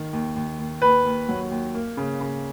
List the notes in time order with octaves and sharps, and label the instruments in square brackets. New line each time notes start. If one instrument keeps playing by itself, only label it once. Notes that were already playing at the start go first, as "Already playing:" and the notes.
Already playing: [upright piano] D#3
D#2
D#2
D#2
[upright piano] D#2 [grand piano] B4
[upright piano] D#2
F#3
D#2
A#3
C#3
C#3